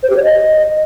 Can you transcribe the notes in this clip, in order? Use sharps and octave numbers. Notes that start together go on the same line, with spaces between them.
C5
G4
C#5
D#5